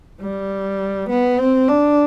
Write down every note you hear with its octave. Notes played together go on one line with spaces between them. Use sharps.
G3
B3
C4
D4